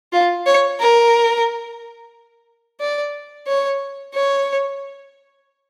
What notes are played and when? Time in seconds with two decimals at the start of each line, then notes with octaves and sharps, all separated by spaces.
0.13 F4
0.46 C#5
0.80 A#4
2.81 D5
3.47 C#5
4.14 C#5